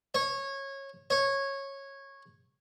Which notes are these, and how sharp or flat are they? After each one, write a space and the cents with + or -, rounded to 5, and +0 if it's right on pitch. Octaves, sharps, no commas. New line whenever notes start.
C#5 -20
C#5 -15